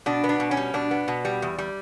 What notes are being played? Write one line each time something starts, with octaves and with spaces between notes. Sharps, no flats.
B2 D4
B3
D4
B2
C#4
G3
B2 D4
B3
B2
G3
E2
G3